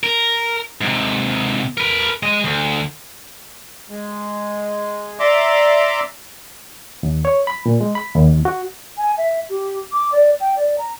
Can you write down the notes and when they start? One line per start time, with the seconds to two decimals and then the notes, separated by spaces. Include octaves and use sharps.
0.03 A#4
0.81 G#2 C3
1.77 A#4 B4
2.23 G#3 D#5
2.44 D2
3.90 G#3
5.19 D5 E5 A#5 C6 D6
7.03 D#2
7.25 C#5
7.47 B5
7.66 A#2
7.81 G#3
7.95 B5
8.15 D#2
8.45 F#4
8.98 G#5
9.18 E5
9.50 G4
9.92 D6
10.12 D5
10.40 G5
10.56 D5
10.78 A#5